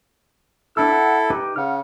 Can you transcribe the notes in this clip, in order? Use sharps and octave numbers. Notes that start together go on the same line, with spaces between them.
B3 D4 E4 A4 E6
F#5
D#4 G4 B4
C#3 F#5 F6